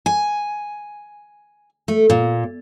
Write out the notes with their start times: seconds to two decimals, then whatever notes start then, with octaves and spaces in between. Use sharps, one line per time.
0.06 G#5
1.88 A3
2.10 A#2